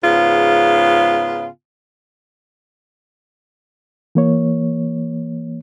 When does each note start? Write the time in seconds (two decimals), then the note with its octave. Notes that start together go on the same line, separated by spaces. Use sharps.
0.03 G#2 C#3 B3 F4
4.15 E3 A#3 C#5